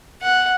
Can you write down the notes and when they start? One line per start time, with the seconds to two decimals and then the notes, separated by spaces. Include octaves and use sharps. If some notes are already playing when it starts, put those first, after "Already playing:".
0.22 F#5